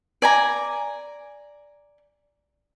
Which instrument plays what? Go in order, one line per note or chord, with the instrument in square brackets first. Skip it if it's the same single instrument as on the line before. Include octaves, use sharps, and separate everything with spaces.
[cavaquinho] D5 G#5 A#5